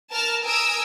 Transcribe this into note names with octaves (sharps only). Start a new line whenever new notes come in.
A#4 A5 F6
A#4 G#5 D#6 E6 D7